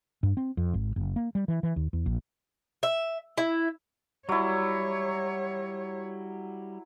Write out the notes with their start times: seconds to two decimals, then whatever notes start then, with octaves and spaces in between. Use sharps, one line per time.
0.23 G2
0.37 C4
0.57 F2
0.74 G#1
0.96 F#1
1.16 A#3
1.35 G3
1.48 E3
1.63 E3
1.76 D#2
1.93 E2
2.06 A#1
2.83 E5
3.38 E4
4.29 F#3 G3 E4 C#5